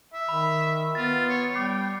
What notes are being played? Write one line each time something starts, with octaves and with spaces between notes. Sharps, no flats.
E5
D#3 B5
B3 F4 A6
C#5
G3 G5 D6 C7